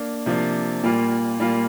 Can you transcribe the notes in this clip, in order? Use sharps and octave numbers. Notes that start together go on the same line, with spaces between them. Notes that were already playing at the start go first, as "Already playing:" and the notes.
Already playing: A#3 D4
C3 F3 A#3 D4
A#2 G3 A#3 F4
A#2 G3 A#3 F4